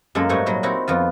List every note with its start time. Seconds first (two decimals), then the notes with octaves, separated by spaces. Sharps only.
0.15 F#2 G#3 A#3 A4
0.29 G#2 G3 A3 D#4 C#5 F#5
0.46 A#2 F#3 G3
0.63 C4 D#4 E4 F#4 A4
0.88 F2 B3 F4